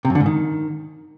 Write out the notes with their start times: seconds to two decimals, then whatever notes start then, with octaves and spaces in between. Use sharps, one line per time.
0.05 C3
0.10 F#2
0.15 D3
0.21 G#2
0.26 D#3